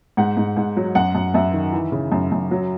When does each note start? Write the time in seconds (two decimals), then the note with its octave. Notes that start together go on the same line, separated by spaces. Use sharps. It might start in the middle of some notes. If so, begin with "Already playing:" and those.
0.17 G#2 F#5
0.37 G#2
0.57 G#2
0.77 F#3
0.95 F#2 F#5
1.15 F#2
1.34 F#2 E5
1.53 D#3
1.73 E3
1.92 C#3
2.12 F#2
2.32 F#2
2.51 F#3